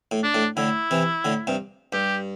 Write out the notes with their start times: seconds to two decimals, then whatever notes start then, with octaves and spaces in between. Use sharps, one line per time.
0.11 A2
0.23 D4
0.34 A2
0.57 A2 D3 E4
0.91 C3 E3
1.25 A2 D3
1.47 G2 C3
1.93 G2 G4